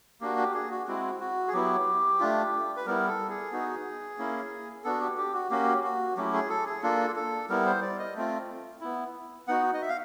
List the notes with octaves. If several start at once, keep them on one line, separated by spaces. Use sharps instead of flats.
A#3 D4 F#4 G4
G4
G#4
F#4
G#3 C4 E4 F#4
F#4
G#4
F#3 B3 E4 G4
A3 D4 F4
B4
G3 B3 E4 A#4
A4
G#4
B3 D#4 F#4
A#3 C#4 E4
B3 D4 F#4 A4
G4
G4
F#4
A#3 C#4 F#4 G4
F#4
F#3 A3 C#4 E4 G4
G#4
A4
G#4
A#3 D4 F4 A4
A4
G3 B3 E4 A#4
C5
D5
D#5
A3 C4 F4
B3 E4
B3 D#4 F#4 F#5
D#5
E5
F5